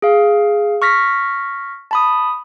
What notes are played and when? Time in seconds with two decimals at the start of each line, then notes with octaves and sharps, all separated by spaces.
0.02 G#4 F5
0.82 C#6 F6 A#6 B6
1.91 A5 B5 D#6